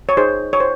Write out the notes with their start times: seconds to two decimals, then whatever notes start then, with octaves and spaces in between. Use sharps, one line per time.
0.09 C#5
0.17 D#4 G#4 C5
0.41 D#4
0.53 C#5
0.60 C5